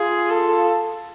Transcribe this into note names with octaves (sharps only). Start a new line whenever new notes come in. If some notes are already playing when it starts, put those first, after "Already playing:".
Already playing: F4 G#4
A4